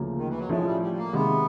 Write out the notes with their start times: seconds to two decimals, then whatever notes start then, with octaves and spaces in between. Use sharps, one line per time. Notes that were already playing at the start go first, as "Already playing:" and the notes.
Already playing: D2 C#3 F3 A#3
0.17 D#3
0.28 E3
0.38 F#3
0.49 A2 F3 G#3 A3 C#4 E4
0.65 G3
0.81 G3
0.97 A#3
1.13 C3 D#3 G#3 B3